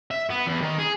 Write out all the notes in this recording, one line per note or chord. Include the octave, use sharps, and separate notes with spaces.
E5
B3
E2
D#3
G#4